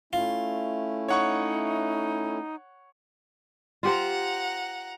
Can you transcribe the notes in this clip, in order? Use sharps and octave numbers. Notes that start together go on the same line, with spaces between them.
A3 C#4 E4 F4
D#4 C#5 F#5 C#6
F4 G4 C5 F#5 A#5